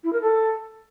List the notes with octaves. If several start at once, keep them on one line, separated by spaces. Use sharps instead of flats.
E4
A#4
A4